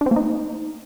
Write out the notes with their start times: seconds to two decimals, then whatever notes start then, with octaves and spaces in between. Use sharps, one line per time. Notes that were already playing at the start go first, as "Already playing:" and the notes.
0.01 D4
0.06 C4
0.11 A#3
0.16 D#4